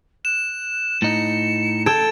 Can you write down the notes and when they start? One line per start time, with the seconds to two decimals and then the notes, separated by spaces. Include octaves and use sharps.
0.25 F#6 E7
1.02 A2 D#4 C#7
1.86 A4 G5 G#6 D7 E7